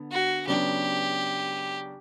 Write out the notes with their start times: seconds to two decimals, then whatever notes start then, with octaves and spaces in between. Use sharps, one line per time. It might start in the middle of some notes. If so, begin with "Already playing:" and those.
Already playing: D3 B3
0.11 F#4
0.47 C#3 F#3 B3 D4 G4